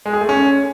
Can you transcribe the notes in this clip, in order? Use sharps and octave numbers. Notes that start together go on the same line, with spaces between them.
G#3
G#4
A3
C#4